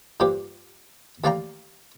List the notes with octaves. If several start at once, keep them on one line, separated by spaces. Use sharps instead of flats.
G2 F3 A#3 G4 D6
D#2 A3 D5 F5 G5 A#5